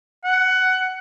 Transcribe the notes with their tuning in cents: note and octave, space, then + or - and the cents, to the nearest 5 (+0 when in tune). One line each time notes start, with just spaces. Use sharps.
F#5 +15